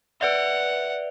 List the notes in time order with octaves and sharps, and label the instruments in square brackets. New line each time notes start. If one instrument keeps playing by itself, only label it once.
[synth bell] B4 D5 E5 [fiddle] F#5